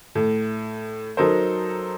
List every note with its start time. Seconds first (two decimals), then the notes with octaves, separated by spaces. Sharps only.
0.15 A2
1.17 F#3 D#4 A4 A#4 C5